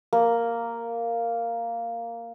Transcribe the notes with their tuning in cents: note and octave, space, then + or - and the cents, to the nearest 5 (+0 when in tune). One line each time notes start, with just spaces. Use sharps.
A#3 -5